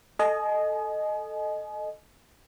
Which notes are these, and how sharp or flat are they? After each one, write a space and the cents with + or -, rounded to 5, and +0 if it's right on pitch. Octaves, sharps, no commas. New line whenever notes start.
A4 +0 D#5 -10 G#5 +30